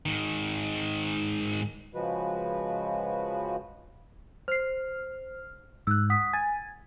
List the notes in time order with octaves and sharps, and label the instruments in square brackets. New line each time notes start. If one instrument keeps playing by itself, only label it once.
[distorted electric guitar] G#2 D#3
[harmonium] C#3 F3 G#3 F#4 B4
[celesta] C5 C7 [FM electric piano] F6
[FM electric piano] G#2 [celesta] E6 F#6
[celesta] F#5 D#6 B6
[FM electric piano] G#5 [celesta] A6